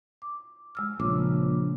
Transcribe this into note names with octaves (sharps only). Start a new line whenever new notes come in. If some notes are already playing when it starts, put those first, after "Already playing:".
D6
G#3 E6 F6
A#1 C#3 D6